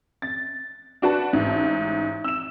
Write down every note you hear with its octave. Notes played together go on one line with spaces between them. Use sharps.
A6
D4 F#4 B4 A5
A1 G#2
E6 E7